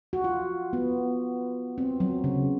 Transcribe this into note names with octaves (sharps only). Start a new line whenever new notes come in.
F#4
F4
B3
C4
F#3
C#3